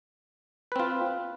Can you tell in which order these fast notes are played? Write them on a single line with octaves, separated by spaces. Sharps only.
B4 C4 F4